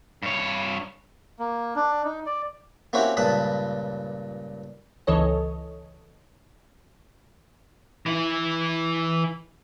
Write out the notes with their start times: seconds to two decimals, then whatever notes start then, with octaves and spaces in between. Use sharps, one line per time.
0.23 G2 C#5
1.39 A#3
1.76 D4
2.04 D#4
2.26 D5
2.93 A#3 C4 C#4 E4 F#4 G4
3.17 C#2 G2 A#2 B4 A5 B5
5.07 G1 C#2 E3 A4 C#5 D#5
8.06 E3 E4